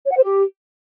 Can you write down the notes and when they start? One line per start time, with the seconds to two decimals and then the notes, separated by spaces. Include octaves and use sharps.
0.06 C#5
0.12 F#5
0.18 C5
0.24 G4